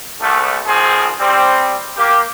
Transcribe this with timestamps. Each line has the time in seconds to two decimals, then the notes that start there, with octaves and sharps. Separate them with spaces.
0.20 C2 A3
0.66 A1 D#3 F3 C4 G#4
1.19 G3 C4
1.97 A#3 G4